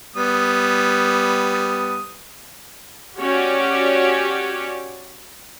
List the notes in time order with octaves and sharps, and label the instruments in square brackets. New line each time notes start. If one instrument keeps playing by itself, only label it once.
[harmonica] G3 B3 D#6
[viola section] C#4 F#4 G4 C#5 D5